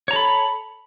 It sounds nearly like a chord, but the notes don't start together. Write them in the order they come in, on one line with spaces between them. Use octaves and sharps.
C#5 A#5 A4 B5